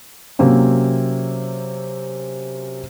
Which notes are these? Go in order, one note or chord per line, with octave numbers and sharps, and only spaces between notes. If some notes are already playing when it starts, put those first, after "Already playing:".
C3 F#3 A#3 C4 C#4